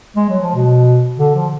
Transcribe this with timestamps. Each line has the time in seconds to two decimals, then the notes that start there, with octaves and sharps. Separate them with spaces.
0.16 G#3
0.29 F#3
0.42 F3
0.55 B2
1.18 D3
1.35 F3